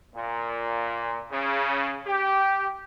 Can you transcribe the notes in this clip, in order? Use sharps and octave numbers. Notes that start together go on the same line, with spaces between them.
A#2
C#3
G4